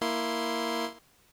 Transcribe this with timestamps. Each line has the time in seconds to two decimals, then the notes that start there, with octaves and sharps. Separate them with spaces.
0.01 A#3 E4 C6